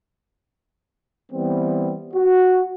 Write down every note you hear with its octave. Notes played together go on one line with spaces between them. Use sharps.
E3 G3 B3 C4
F#4